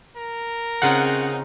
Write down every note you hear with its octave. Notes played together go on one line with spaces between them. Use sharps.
A#4
C#3 C4 D#4 F4 G#4 F#5